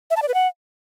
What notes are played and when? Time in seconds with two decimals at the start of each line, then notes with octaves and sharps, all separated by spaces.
0.10 E5
0.16 A5
0.22 D5
0.28 B4
0.34 F#5